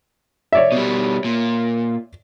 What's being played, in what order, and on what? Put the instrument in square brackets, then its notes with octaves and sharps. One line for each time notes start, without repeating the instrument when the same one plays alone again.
[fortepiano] C#5 D5 E5
[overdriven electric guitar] B2 G3
A#2